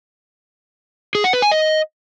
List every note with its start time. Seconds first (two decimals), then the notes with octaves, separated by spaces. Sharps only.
1.15 G#4
1.24 F#5
1.33 B4
1.42 G#5
1.52 D#5